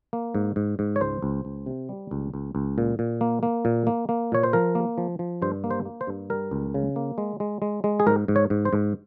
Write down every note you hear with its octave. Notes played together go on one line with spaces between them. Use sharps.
A#3
G#2
G#2
G#2
C#5
C#2 C5
C#2
C#2
C3
G3
C#2
C#2
C#2
A#2
A#2
A#3
A#3
A#2
A#3
A#3
A#2 C#5
C5
F3 A#4
A#3
F3
F3
G2 C5
A#3
C5
A#3
C5
G2
G3 A#4
C#2
C#3
A#3
G#3
G#3
G#3
G#3
G#4
G#2 A#4
G#2
C#5
G#2
C5
G#2